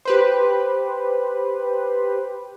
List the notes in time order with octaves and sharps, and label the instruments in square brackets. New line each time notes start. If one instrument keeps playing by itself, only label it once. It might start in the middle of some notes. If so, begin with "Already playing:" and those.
[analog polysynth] G4 B4 C5